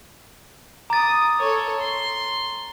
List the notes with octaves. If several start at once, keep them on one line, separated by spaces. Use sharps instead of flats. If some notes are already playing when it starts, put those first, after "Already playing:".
A#5 D6 D#6 A6
A4 C#5
C6